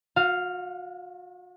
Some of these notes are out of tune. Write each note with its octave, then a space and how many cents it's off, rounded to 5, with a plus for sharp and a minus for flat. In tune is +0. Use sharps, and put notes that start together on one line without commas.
F#4 -40 F5 +0